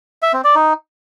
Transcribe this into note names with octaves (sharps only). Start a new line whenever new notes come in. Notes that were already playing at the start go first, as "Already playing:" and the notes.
E5
C4
D5
D#4